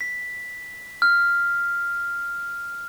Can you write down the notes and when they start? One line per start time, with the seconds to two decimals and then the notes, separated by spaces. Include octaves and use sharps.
0.01 B6
1.02 F6